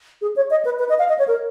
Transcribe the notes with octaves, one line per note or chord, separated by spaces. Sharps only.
G#4
C#5
D#5
B4
B4
D#5
F5
D#5
C#5
A#4